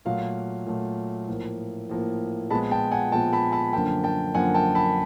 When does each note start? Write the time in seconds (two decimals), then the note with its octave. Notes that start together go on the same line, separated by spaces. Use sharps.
0.05 A#2 F#3 A3 F5
0.66 A#2 F#3 A3
1.28 A2 F3 A#3
1.89 A2 F3 A#3
2.50 A#2 F3 G#3 B3 A5 B5
2.71 G5 A5
2.91 F#5 G#5
3.12 A#2 F3 G#3 B3 G5 A5
3.32 A5 B5
3.52 A5 B5
3.73 F#2 D3 F3 A#3 G5 A5
4.04 G5 A5
4.34 F#2 D3 F3 A#3 F#5 G#5
4.54 G5 A5
4.75 A5 B5